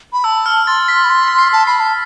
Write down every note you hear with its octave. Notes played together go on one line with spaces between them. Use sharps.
B5
A5 E6
F6
C6 A6
B6
B5
C6 B6
B6
C7
A5
B5 C7
A5